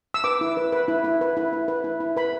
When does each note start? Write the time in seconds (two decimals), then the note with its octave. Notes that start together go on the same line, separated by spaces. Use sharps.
0.14 E6
0.24 B4 D6
0.41 E4
0.57 B4
0.72 B4
0.88 E4
1.04 E4
1.21 B4
1.37 E4
1.53 E4
1.68 B4
1.84 E4
2.00 E4
2.17 B4 B5